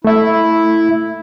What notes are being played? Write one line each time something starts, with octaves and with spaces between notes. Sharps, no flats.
A3 E4 E5